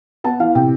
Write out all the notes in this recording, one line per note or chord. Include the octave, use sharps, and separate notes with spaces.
B3 A5
E3 F5
C3 G5